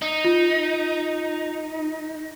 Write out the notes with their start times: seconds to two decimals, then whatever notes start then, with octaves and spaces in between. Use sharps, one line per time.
0.02 D#4
0.25 F4